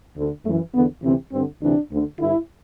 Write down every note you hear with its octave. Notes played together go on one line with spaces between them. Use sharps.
D2 D3
F#2 E3 A3
E2 D3 B3
D2 C3 E3 C4
G2 D3 C4
D2 C3 E3 D4
D2 D3
G2 D3 E4